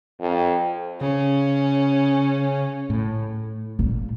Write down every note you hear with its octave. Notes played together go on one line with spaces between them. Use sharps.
F2
C#3 C#4
A2
A#2